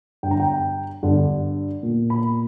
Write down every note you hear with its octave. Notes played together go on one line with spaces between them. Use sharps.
G2 D3 G5
A#5
G5
G2 D3
A#2
B5